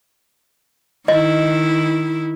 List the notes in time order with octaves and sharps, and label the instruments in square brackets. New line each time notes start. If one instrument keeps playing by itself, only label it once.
[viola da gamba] D#3 E4 [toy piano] D#5